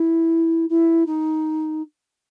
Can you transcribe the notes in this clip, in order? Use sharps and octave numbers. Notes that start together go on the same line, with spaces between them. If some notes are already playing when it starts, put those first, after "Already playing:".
Already playing: E4
E4
D#4